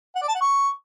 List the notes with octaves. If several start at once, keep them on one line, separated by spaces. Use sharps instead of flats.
F#5
D5
A5
F#5
C#6